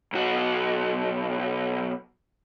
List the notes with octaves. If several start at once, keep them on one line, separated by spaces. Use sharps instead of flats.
B1 F#4